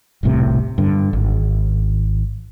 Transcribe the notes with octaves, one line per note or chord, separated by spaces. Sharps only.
E1 C2 A2 C3
G2 D3
G#1